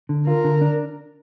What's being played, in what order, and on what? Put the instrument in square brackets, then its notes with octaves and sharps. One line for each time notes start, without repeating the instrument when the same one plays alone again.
[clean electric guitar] D3
[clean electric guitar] F4 [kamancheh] A#4
[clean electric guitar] D3
D4